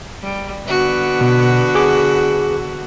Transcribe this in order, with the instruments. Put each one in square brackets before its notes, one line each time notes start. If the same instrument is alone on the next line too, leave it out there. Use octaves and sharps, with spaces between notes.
[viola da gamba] G3
D3 B3 F#4
[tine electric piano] B2
G#4 D6